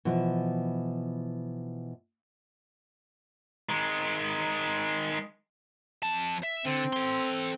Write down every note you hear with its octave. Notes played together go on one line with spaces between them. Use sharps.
B2 E3 F3
D#3 G#3
F2 A5
E5
D3 C4
A4 C6